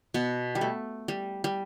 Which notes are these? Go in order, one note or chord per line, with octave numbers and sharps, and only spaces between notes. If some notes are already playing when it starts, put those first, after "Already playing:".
B2 B3
G3
A3
G3
G3